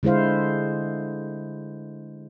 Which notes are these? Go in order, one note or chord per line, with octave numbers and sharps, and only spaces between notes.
D3 G#3 E4 C5 F5